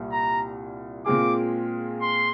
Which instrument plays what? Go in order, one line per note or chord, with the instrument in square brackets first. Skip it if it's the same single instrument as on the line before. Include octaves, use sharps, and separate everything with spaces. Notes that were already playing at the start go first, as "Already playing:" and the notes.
Already playing: [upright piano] C2 A#2 G3
[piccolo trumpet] A#5
[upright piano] A#2 G#3 C4 F4 G#4 [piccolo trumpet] D6
[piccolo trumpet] C6